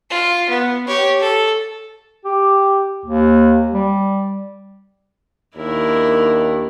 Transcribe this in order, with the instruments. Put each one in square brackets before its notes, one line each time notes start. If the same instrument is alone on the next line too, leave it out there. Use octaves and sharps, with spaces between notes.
[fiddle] F4
B3
G4 C#5
A4
[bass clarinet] G4
D#2
G3
[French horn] D#2 [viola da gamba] D4 E4 A#4